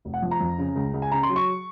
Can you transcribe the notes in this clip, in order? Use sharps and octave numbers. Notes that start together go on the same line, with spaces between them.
F1
F#5
F3
A#5
F2
C#3
C#2
C#2
G#5
C#3 A#5
C6
F#3
C#6